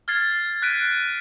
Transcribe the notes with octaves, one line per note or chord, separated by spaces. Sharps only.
F6 G#6 A6 C7
F#6 B6 D7 D#7